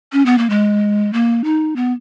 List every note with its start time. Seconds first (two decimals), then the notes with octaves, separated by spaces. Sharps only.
0.12 C#4
0.26 B3
0.38 A#3
0.50 G#3
1.13 A#3
1.44 D#4
1.76 B3